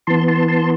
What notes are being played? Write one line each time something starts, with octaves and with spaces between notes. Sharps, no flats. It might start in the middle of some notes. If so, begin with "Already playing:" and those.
E3 B3 A5 C6
A5 C6
A5 C6